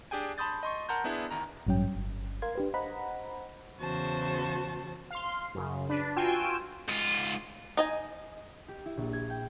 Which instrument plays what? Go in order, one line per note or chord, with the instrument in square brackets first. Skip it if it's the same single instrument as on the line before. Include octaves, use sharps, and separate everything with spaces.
[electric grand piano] D4 G4 G#4 G5 G#5
A5 B5 C6 D#6 G6 A6
D#5 C6 C#6
A#4 F#5 A5 A#5 C6 G6
B3 D4 E4 G#4
D2 D#3 A#5
[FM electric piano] A1 G2 F#3 C#4 G5
G1
A#4 F5 C6 G#6
D4 G4 B4
C5 D#5 F#5 A#5 B5
[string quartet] E2 C#3 F#4 C5 A5
[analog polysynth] F5 C6
F#2 C#3
D4 B4
F4 F#4 G5 G#5 E6
[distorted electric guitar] G#2 F4
[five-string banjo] D#4 D#5 G#5
[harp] G4
E4
A#1
G#6
G5